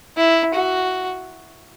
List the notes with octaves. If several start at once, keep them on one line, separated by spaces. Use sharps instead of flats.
E4
F#4